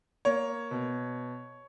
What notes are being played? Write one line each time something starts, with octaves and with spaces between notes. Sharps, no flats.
A#3 C#5
B2